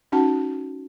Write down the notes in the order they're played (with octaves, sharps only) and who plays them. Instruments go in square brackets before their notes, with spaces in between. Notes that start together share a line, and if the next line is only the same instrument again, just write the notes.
[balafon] C#4 D#4 F#4 F#5 A5